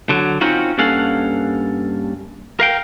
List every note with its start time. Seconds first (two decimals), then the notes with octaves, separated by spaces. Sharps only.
0.09 D3 F#3
0.41 C4 C#4 D#4 F4 F#4
0.78 G2 A#3 C#4 A4 F5 F#5
2.60 A#4 F5 G5